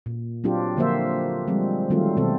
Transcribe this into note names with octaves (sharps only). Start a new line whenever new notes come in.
A#2
F#3 C4 D4 F4 G4
D3 F3 A#3 F#4 C5 E5
F3 G3 G#3 C4
D#3 F#3 G3 A3 C4 F4
B2 D#3 C4 A4